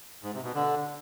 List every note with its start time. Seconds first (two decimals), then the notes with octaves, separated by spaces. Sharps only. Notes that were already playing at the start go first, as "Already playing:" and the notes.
0.23 G#2
0.33 C3
0.44 B2
0.54 D3